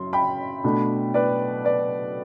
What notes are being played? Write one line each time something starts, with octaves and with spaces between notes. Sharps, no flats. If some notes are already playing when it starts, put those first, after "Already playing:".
Already playing: F#2 C6
G5 B5
B2 A3 D4
B4 D5
B4 D5